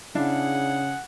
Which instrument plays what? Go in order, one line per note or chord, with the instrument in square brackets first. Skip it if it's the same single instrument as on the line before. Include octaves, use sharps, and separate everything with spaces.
[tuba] C#3 [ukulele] D4 E4 F5 [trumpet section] G#4 F#5